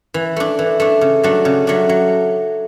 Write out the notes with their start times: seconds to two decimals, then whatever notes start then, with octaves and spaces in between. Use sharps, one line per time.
0.14 E3
0.36 A3 D4
0.59 E3
0.80 A3 D4
1.01 C#3
1.23 F#3 A3 D4
1.45 C#3
1.67 F#3 A3 D4
1.89 F#3